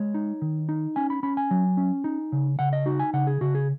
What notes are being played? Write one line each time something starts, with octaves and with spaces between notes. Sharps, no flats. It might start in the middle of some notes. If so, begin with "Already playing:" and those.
Already playing: G#3 C#5
D#4
D#3
D#4
C#4 G#5
B5
C#4 B5
G#5
F#3
C#4
D#4
C#3
C#3 F#5
D#5
D#4 F#4
G#5
C#3 F#5
G#4
C#3 F#4
G#4